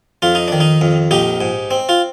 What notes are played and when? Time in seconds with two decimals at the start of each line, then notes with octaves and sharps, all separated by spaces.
0.22 F2 F4
0.35 D#4
0.48 D#3 D4
0.60 D#4
0.81 F2
1.11 A#1 D#4 G4
1.41 G#2
1.71 C4
1.89 F4